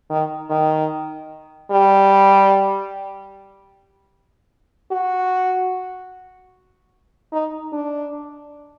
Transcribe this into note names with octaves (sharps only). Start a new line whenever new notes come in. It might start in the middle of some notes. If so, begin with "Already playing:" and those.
D#3
D#3
G3
F#4
D#4
D4